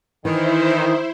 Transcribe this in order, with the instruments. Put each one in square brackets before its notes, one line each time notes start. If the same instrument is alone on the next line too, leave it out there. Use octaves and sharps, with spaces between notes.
[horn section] D#3 [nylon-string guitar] E3 [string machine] E4 C5